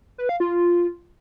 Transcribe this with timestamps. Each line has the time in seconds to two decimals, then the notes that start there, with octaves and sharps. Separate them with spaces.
0.18 B4
0.29 F5
0.40 F4